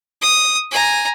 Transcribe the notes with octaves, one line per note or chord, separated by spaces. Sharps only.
D#6
G#5 A#5